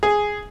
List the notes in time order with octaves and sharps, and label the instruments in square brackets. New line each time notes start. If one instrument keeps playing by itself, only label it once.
[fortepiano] G#4